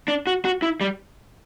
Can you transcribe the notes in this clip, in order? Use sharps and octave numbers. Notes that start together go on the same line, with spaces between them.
D4
F#4
F#4
E4
G3